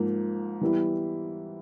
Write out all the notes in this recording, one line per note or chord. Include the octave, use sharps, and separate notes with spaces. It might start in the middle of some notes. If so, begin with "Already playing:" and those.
Already playing: G#2 F3 A#3
E3 G3 B3 E4